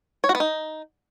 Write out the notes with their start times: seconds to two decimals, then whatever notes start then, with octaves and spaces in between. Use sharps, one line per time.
0.24 C#5
0.29 F#4
0.35 B3
0.40 D#4